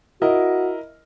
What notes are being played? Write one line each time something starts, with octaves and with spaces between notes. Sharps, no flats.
E4 F#4 A#4 D#5